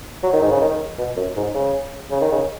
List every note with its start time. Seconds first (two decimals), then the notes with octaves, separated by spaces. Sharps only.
0.23 F#3
0.33 D#3
0.42 G#2
0.51 C#3
0.61 D#3
0.98 B2
1.17 F#2
1.36 G#2
1.54 C#3
2.11 C#3
2.21 D#3
2.32 C#3